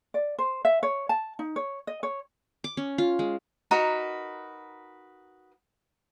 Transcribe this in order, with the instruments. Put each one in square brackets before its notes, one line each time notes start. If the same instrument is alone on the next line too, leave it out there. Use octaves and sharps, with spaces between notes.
[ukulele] D5
C5
E5
C#5
A5
D#4
C#5
D#5
C#5
[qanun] D6
C#4
F4
G#3
[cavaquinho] D#4 F#4 A#4 B4